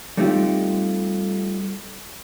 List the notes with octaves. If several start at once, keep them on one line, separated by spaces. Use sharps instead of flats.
G3 A3 C4 D#4 F4 G4